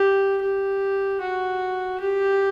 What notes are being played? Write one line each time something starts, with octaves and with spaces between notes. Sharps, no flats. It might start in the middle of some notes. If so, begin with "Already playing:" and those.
Already playing: G4
G4
F#4
G4